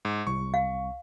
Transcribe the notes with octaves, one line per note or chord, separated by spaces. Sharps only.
G#2
C2 C#6
F5